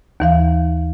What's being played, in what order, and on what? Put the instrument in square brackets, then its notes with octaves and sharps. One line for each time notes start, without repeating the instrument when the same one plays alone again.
[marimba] D#2 E3 F5